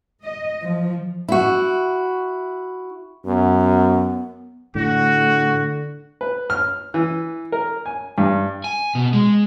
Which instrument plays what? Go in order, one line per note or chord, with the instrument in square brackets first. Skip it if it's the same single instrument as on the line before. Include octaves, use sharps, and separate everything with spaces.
[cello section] D#5
F3
[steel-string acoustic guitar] E4 F#4
[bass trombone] F#2 [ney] B3
[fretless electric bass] A2 [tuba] D3 [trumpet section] F#4
[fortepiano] B4
F6
E3
A#4
G#5
G2
[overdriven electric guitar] G#5
B2
G#3